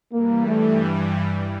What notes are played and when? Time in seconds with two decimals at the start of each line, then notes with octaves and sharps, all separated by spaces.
0.13 G2 E3 G3 A#3
0.47 A3